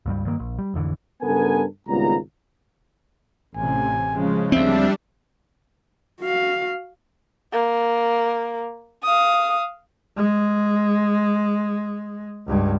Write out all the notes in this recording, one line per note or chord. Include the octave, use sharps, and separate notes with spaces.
C#2 G2 G3
G2 D#3 G#3 A#3
A#1
G3
A1 F2 D3 E3
G2 C#3 B3 A4 A#4 G#5
G#1 C#2 G3 B3 F4 A#5
A1 C3 G#5
C#3 F3 G#3
D2 G3 C4 D4 E5
F#4 F5
A#3
F5 D#6
G#3
C#2 G2